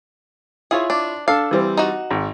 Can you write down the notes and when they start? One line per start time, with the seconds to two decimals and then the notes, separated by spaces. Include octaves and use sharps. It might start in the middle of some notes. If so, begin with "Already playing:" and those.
0.71 E4 F4 G#4 C#5
0.90 D4
1.28 D4 A4 F5
1.51 E3 G3 C4
1.77 D#4 F#4
2.11 G#1